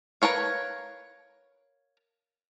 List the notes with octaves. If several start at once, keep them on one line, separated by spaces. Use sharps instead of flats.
A#4 B4 C#5 F5